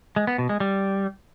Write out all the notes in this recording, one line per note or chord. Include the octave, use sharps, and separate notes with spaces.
G#3
B3
B2
G#3
G3